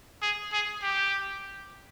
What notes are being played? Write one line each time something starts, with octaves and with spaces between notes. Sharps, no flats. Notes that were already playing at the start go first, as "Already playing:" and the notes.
G#4
G#4
G4